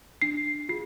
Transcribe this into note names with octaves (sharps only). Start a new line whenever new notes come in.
D4 C7
F4 G#4 C7